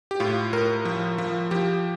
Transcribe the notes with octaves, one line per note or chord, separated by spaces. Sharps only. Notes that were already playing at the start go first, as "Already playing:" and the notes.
G4
A2 F4
A2 A#4
F3
F3
F3 G4